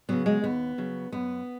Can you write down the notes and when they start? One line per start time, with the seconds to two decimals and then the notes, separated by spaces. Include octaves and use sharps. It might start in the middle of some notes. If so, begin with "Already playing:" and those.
0.09 C#3 F#3 B3
0.26 G#3
0.44 D#2 B3
0.78 C#3 F#3
1.12 F#2 B3